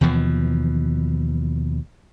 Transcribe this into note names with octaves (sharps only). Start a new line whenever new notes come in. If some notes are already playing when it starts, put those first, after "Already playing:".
D#2 B2 E3 F3